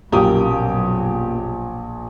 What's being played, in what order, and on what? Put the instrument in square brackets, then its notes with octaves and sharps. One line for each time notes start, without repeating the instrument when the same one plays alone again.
[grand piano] A#1 D#6 [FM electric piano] F#2 A#3 [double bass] B2 F#3 [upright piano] G4